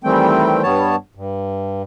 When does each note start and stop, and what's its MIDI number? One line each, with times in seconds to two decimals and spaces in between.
0.04 0.62 51
0.04 0.62 52
0.04 0.62 55
0.04 0.62 57
0.04 0.62 60
0.04 0.62 79
0.63 0.96 43
0.63 0.96 55
0.63 0.96 59
0.63 0.96 73
0.63 0.96 81
1.15 1.82 43